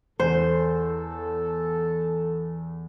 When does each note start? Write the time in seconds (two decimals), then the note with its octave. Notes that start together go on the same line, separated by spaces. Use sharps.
0.20 E2 A4 C5